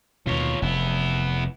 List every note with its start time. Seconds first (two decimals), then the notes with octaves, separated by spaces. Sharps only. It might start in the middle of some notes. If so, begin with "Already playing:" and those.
0.27 D#2 B2 F4 C#5
0.62 F1 B3 E4